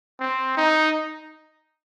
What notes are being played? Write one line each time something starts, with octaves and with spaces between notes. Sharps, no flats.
C4
D#4